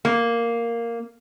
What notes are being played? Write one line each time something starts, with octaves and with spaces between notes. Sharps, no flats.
A#3